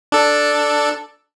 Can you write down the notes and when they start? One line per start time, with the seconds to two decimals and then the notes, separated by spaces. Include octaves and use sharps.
0.12 D4 A4